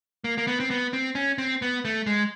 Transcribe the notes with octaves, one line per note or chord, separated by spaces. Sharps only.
A#3
A#3
B3
C4
B3
C4
C#4
C4
B3
A3
G#3